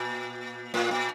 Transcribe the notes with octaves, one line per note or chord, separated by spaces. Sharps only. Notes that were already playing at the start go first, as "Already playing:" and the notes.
Already playing: A#2
A2
A#2